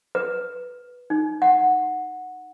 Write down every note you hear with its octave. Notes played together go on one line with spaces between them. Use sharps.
B4
D#4
F#5